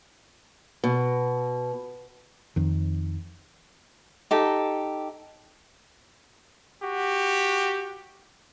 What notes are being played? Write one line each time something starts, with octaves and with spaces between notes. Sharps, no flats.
B2
F2 D#3
D#4 G4 A4
F#4 G4